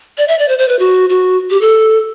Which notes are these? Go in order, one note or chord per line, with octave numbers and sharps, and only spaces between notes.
D5
E5
D5
C5
C5
B4
F#4
F#4
G4
A4